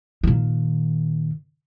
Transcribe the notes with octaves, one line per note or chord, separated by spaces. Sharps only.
A#2 D#3